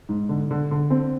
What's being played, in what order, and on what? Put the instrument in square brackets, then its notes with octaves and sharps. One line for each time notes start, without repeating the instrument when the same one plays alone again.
[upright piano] G#2
D3
D3
D3
C4